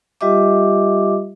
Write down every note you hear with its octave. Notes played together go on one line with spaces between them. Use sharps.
G3 F4 G4 D#5 E5 D6